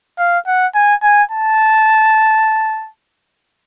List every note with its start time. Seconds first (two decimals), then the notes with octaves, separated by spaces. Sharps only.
0.19 F5
0.47 F#5
0.75 G#5
1.03 G#5
1.31 A5